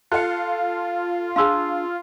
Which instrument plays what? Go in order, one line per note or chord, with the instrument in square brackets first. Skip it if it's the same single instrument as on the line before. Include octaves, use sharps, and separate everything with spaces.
[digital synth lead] F4 [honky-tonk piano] A4 F5 [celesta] F#6 C#7
[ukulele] D4 G#4 G#5 [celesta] F5 C6 E6